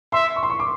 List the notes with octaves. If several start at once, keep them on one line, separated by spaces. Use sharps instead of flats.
E5 C6
C#6
C6
C#6
D6